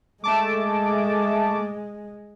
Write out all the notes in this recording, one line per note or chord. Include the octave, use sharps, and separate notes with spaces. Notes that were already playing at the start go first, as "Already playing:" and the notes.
G#3 A3 A5 D6